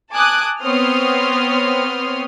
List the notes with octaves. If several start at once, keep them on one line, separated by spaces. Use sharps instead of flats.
G#5 A5 D6 D#6 F#6
B3 C4 C#5 C6 D#6 F6